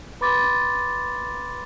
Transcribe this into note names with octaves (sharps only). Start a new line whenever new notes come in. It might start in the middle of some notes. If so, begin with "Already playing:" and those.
B4 B5 C6 D6 A6